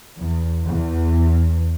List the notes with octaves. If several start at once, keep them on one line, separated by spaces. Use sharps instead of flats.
E2
E2